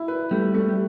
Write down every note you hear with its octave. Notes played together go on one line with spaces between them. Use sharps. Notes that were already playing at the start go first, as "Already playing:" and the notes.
Already playing: E4
B4
G3 A3
A3